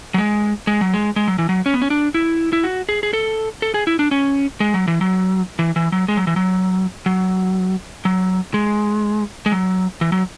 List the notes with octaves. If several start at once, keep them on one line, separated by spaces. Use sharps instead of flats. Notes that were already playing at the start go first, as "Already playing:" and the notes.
F#3
G#3
G#3
F#3
G#3
G#3
F#3
E3
F#3
C#4
B3
C#4
D4
E4
E4
F#4
G#4
G#4
A4
A4
G#4
E4
D4
C#4
G#3
F#3
E3
F#3
E3
E3
F#3
G#3
F#3
E3
F#3
F#3
F#3
G#3
G#3
F#3
E3
F#3